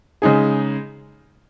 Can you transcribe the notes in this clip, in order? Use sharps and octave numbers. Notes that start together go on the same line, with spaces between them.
C#3 G#3 D#4 G#4